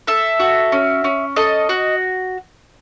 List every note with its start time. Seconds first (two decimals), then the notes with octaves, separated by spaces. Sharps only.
0.07 A4 E5
0.40 F#4
0.72 C#4
1.04 C#4
1.36 A4 D#5
1.69 F#4